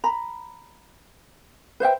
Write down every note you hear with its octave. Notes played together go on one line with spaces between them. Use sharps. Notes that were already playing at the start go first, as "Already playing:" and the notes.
A#5 B5
B4 C5 E5 G5